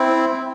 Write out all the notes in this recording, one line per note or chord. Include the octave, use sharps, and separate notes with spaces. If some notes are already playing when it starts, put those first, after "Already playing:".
Already playing: C4 E4